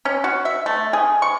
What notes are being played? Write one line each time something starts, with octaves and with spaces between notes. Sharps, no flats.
C#4
F#4
E5
A3
G#4
C#6